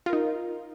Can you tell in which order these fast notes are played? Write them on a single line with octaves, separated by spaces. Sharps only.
F4 A#4 D#4